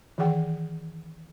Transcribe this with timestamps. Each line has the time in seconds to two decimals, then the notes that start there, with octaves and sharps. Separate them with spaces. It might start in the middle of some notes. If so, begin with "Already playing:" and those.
0.18 D#3 E3 G#4 F#5 G5